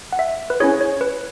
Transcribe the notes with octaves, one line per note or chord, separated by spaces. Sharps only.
F#5
E5
B4
C#4 E4 G#4 C#5
C#5
B4